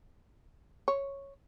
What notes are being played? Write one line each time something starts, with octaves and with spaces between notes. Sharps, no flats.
C#5